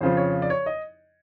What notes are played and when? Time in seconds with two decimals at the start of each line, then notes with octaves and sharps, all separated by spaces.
0.01 F2 C#3 F3 C5
0.17 C#5
0.42 D5
0.50 C#5
0.66 D#5